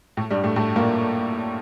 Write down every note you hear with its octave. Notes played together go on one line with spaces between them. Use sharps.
A2 A3
G2 G3
A2 A3
A2 A3
A#2 A#3